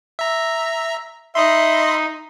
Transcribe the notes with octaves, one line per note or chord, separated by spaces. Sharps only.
E5 A#5
D#4 D#5 E5 B5 C6